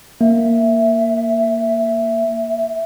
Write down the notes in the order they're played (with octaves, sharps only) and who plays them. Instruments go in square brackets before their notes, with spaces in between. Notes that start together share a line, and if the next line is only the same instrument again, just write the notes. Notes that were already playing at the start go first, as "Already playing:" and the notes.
[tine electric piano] A#3 [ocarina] E5